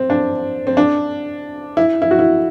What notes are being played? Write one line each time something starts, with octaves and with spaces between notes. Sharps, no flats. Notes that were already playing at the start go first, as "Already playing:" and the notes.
Already playing: C4
D4
C4
D4
E4
E4
F#4
E4